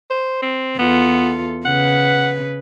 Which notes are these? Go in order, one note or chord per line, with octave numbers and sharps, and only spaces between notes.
C5
C4
E2 B3 F4 A4
C#3 B4 F#5